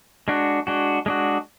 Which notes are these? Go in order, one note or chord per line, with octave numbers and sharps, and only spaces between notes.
G#3 D4 F#4
G#3 D4 F#4
G#3 D4 F#4